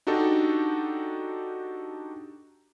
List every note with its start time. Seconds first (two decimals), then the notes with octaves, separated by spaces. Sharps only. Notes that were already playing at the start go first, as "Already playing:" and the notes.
0.07 D4 D#4 F#4 G4 A4